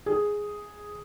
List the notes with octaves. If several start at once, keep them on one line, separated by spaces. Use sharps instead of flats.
G#4